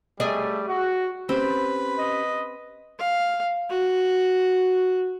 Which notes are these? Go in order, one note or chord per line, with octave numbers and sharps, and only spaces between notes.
G3 A3 G#4 D5 D#5
F#4
C4 C#4 G4 B4 B5
D#5
F5
F#4